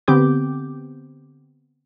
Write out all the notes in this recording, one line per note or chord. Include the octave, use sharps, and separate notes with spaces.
D3 B3 C4 G4 D6 G6